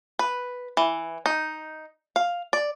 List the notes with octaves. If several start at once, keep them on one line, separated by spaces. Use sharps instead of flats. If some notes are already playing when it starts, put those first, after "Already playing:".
B4
E3
D#4
F5
D5